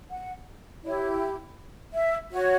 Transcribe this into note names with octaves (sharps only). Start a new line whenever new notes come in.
F#5
E4 G4 C#5 D5
C#5
E5
F#4 C#5